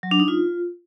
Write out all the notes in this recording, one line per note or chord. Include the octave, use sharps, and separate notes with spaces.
F#3
D4
D#4
F4